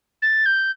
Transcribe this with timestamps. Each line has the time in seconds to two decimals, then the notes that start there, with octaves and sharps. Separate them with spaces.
0.22 A6
0.45 G6